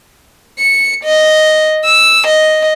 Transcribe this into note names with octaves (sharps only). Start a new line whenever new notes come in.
C#7
D#5
E6
D#5